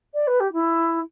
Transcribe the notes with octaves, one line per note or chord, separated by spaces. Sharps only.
D5
B4
G4
E4